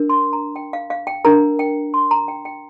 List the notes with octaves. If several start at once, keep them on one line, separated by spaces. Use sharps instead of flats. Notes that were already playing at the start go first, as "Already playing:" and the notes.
Already playing: D4 A#4
C6
A#5
G5
F5
F5
G5
D4 A#4 A#5
G5
C6
A#5
G5
G5